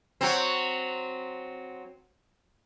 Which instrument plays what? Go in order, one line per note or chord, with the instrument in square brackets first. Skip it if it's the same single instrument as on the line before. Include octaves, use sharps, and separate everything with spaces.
[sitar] F#3 C4